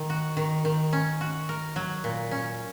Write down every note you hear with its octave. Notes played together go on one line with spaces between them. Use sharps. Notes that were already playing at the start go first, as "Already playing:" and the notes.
Already playing: D#3
F#4
D#3
D#3
C#4
F#4
A#4
F#3
A#2
C#4